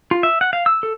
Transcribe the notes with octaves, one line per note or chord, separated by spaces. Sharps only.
F4
E5
F#5
F5
E6
A4